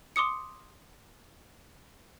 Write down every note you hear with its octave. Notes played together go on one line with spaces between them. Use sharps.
C6 D6 D#6 C#7